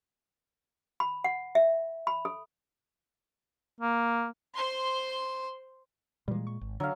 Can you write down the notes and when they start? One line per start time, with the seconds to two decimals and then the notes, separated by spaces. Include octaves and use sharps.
1.00 B5
1.24 F#5
1.55 E5
2.07 B5
2.25 A4
3.81 A#3
4.55 C5 C6
6.28 A#2 E3 G3 G#3
6.47 C#6
6.61 G#1
6.80 D3 F#3 F5